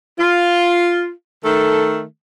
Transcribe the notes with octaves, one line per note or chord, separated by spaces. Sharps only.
F4
D#3 A3 A4